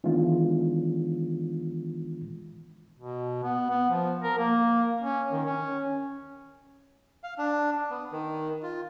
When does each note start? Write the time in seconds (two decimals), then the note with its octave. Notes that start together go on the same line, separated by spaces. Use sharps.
0.04 D#3 E3 G#3 B3 D4 F4
2.99 B2
3.43 B3
3.70 B3
3.90 F3
4.23 A#4
4.38 A#3
5.01 C#4
5.32 D#3
5.45 C#4
7.24 F5
7.38 D4
7.90 B3
8.12 D#3
8.63 F4